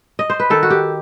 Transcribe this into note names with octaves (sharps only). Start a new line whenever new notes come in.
D#5
C5
B4
D#3 A4
F#4
G4